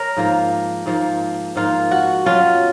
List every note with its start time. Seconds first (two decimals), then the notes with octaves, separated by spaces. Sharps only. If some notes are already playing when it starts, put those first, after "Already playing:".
Already playing: A#4 C#5
0.17 G#2 F3 A#3
0.86 G#2 F3 A#3
1.56 G#2 F3 A#3 F4
1.91 F#4
2.26 B2 F#3 C#4 F4